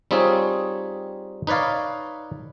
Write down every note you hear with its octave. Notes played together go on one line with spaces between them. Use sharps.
G3 C4 D#4 F4 G#4 C#5
D#4 B4 C#5 D5 F5